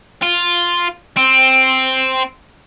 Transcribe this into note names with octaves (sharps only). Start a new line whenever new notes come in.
F4
C4